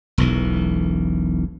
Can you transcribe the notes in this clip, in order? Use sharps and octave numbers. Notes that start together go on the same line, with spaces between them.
E1 B1 E3